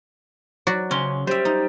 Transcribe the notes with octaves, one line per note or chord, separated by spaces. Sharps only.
F#3 F#4 D5
C#3 C#4 C6
G3 C5 E5
D#4